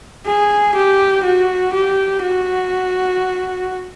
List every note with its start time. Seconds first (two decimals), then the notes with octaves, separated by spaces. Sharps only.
0.27 G#4
0.75 G4
1.24 F#4
1.73 G4
2.23 F#4